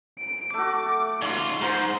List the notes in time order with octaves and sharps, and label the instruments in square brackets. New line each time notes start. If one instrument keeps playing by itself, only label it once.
[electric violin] D7
[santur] A3 F#4 [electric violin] D6
[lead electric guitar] G#2 F4 [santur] C#5
[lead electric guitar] G#2 [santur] A#4 C6 [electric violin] C5